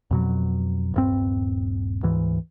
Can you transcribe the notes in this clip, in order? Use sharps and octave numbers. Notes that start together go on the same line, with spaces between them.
F2 B2 F#3
D#1 G2 C4
D2 G#2 E3